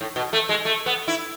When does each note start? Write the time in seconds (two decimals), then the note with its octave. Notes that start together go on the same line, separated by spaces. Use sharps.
0.01 A2
0.16 B2
0.33 A3
0.49 G#3
0.65 A3
0.86 B3
1.08 E4